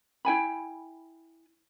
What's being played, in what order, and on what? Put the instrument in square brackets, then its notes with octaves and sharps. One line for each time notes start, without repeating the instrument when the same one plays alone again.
[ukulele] E4 G5 G#5 B5